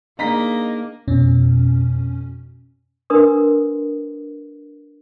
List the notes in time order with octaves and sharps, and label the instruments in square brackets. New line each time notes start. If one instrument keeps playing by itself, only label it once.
[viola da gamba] A#3 [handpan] D4 D#4 G#4 [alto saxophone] D#5 [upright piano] A#5 B6
[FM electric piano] F2 B2 C#4
[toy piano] D4 A#4 B4 C6 D#6